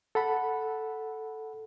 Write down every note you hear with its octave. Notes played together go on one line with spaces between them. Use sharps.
A4 F#5 B5